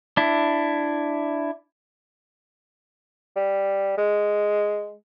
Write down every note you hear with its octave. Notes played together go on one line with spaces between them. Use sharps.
D4 E4
G3
G#3